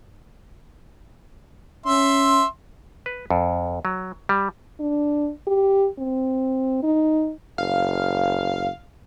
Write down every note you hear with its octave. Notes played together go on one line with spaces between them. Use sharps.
C#4 E5 C6
B4
F2
F#3
G3
D4
G4
C4
D#4
F#1 F5